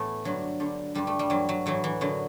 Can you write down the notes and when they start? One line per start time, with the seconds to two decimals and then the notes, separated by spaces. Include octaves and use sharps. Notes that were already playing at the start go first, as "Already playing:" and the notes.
Already playing: A2 E3 A3 B3
0.25 G2 D3 F#3
0.60 G2 D3
0.95 G2 D3 G3
1.07 A3
1.19 G3
1.30 G2 E3 F#3
1.49 F#3
1.66 A2 E3 F#3
1.84 E3
2.01 F#2 D3 F#3